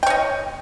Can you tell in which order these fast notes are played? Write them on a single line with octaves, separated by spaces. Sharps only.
G5 C#5 D#5